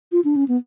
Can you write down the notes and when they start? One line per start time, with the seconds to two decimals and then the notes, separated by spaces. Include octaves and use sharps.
0.12 F4
0.25 D4
0.36 C#4
0.48 B3